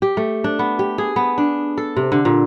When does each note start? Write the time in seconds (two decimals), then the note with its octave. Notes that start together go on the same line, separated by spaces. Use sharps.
0.02 G4
0.17 A3
0.44 D4
0.59 B3
0.79 G4
0.98 G#4
1.16 B3
1.38 D4
1.78 A4
1.97 C3
2.12 D3
2.25 A#2